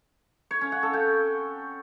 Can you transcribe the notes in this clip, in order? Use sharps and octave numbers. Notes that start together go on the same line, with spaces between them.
C#5
C#4
F#5
A4
G5